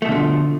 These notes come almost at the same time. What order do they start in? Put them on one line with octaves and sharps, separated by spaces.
A3 B2 D3 G#3 F3